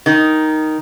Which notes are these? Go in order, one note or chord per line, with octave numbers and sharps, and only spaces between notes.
D#3